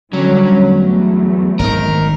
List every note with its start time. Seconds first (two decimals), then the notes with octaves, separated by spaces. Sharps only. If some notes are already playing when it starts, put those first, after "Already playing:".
0.13 D3 F#3 G3 C#4
0.59 E2 A3
1.59 G#1 D#3 A#4